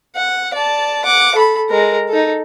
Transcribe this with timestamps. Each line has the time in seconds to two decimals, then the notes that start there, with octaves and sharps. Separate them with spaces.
0.16 F#5
0.53 D5 A5
1.05 F#5 D6
1.35 A4 B5
1.70 G#3 A#4
2.09 D#4 A4